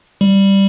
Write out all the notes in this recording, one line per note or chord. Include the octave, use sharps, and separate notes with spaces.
G3